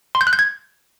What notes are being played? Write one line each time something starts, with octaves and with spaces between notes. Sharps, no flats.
C6
G6
F#6
G6
G#6